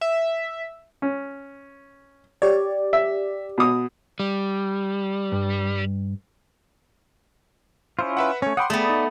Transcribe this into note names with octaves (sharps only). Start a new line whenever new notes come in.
E5
C#4
G4 C#5 D5
E5
B2 D#6
G3
G2
C#4 E4 F4 C5
B4 E5 F#5
A3 C#4 C#5
F#5 G5 B5 C6 D6 D#6
A3 B3 G#4 D5 G5
D#4